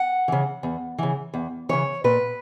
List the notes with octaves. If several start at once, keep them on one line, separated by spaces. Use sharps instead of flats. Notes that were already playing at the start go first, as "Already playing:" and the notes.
Already playing: F#5
C#3 E3
E2
C#3 E3
E2
C#3 E3 C#5
A#2 B4